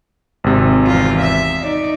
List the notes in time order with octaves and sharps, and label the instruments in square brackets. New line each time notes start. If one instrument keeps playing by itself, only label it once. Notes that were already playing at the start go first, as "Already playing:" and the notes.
[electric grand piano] G#1 C3
[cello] E2 F4
E5
D#4 D5